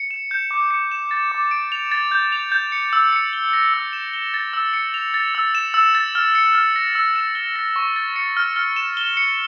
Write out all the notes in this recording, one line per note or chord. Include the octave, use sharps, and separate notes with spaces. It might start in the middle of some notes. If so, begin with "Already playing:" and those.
Already playing: C#7
E7
G6
D6
C#7
E7
A6
D6
D7
F7
A6
G6
F7
G6
C#7
E6
C#7
G7
A#6
E6
E7
G7
A6
E6
C#7
F7
A6
E6
E7
E6
A6
F6
C#7
F6
A#6
E6
E7
G7
A#6
C#6
A6
C#7
F6
F6
E7
G7
C#7